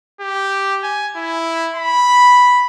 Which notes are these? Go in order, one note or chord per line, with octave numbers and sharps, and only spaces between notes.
G4
G#5
E4
B5